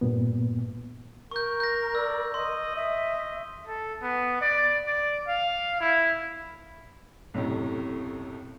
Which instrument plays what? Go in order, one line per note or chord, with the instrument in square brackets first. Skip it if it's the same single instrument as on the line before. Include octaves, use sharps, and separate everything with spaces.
[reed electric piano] G2 A#2 B3
[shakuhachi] A#4 [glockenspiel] C#6 G6
[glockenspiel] G6 A#6
[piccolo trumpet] D5 [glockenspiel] E6
[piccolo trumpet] D#5 [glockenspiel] C6
[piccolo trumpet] D#5 [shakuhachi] E5
[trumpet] A4
B3
D5
D5
F5
E4
[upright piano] B1 F#2 A2 C3